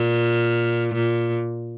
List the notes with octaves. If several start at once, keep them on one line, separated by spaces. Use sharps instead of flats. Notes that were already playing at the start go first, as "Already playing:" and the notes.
Already playing: A#2
A#2